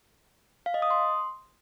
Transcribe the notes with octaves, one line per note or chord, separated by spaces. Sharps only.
F5
D#5
D#6
C6